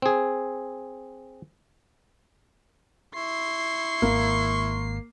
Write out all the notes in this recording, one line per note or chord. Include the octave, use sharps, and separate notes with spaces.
C4 G#4
E4 C6 C#6 C7
G#1 A#3